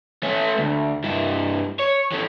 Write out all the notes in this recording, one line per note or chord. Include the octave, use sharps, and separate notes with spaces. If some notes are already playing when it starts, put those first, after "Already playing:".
A3 C#4
D2
G2 E4
C#5
E3 C#4